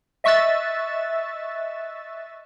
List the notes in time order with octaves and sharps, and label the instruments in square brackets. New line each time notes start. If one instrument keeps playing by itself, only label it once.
[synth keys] D#5 E5 C#6 E6 F#6 A6